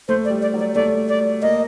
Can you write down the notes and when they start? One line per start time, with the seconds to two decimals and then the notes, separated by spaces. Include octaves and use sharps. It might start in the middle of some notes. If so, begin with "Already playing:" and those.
0.08 A3 C5
0.25 D5
0.30 G3
0.42 D5
0.54 F#3
0.59 D5
0.75 A3 D5
1.09 D5
1.42 A#3 D#5